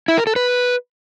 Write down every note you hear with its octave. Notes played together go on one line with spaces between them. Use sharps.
E4
A#4
A4
B4